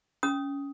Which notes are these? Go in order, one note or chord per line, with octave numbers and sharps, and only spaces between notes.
C#4 D#6